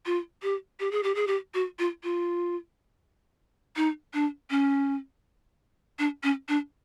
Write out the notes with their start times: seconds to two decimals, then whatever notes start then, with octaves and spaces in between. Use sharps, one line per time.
0.06 F4
0.43 G4
0.80 G4
0.91 G#4
1.03 G4
1.15 G#4
1.27 G4
1.54 F#4
1.79 F4
2.03 F4
3.76 D#4
4.14 D4
4.50 C#4
5.99 D4
6.23 C#4
6.48 D4